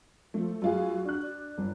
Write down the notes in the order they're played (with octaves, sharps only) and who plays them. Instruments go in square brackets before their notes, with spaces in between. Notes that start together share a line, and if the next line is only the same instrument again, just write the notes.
[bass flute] F3 [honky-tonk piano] A3
[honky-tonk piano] F#2 F4 G#4 [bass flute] F#4
[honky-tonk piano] D4 F#6
[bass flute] D5
[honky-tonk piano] G1